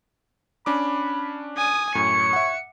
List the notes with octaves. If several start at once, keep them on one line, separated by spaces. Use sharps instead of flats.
C#4 D4 B5 D6
G#5 D#6
F#2 A2 C#5 C#7
E5 F#5